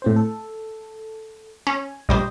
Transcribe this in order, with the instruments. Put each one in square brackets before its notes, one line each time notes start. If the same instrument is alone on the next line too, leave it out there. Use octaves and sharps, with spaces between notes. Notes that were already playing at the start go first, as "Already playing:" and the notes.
[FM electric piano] A2 C4 C5
A4
[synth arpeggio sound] C#4 [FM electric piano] G#5
[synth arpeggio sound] A#1 G3 C5 [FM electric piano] D#5 G5